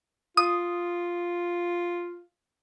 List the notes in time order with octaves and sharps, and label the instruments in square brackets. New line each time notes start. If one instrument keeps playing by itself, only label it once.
[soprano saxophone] F4 [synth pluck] D#6